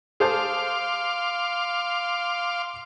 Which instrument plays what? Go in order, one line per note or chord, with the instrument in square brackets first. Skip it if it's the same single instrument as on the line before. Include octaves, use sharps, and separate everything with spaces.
[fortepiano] G#4 C5 A5 [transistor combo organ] F5 C6 D6